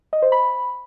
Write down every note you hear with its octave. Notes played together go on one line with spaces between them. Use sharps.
D#5
C5
B5